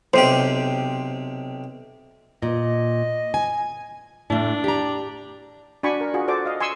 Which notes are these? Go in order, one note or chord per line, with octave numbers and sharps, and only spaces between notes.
B1 C3 G4 C5
A#2 D#5
G#5
A2 A3 D4
G4 A#5
D4 F#4 G#5 B5 C#6
A#4
F4 F#4 G#4
F#4 A4 C5 D5 D6
D#5 F5
G#5 C6 C#6 E6